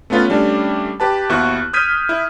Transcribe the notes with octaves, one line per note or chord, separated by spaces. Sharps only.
A3 B3 C#4 F4 B4
G3 A3 C#4 D4
G4 B4 A5
D#2 B3 E4 F#4 C#6 F#6
D#6 F6 G6 G#6 B6 D#7
E4